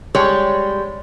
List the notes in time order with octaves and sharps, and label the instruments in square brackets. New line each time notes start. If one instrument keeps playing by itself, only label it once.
[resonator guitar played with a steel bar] G3 G#3 C#5